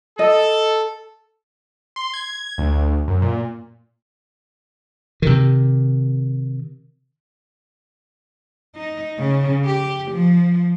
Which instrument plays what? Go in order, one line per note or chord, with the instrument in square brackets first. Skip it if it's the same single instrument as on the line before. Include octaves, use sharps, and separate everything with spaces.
[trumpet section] A4 [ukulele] D#5
[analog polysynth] C6
G#6
D2
F#2
A#2
[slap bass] C3 D#3
[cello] D#4
C#3
G4
F3